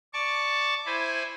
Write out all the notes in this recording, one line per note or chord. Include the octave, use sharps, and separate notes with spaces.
D5 A5 C#6 D6
E4 C5 G#5 B5